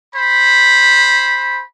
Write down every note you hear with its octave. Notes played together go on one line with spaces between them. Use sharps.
C5 B5